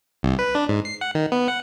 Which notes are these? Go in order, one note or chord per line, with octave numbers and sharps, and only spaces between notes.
C2
B4
D4
G#2
C7
F#5
D#3
B3
F#5